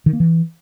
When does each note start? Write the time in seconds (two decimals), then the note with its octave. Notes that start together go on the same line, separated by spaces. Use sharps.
0.06 D#3
0.13 A#3
0.20 E3